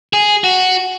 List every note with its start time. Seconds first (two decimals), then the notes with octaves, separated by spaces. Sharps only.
0.13 G#4
0.44 F#4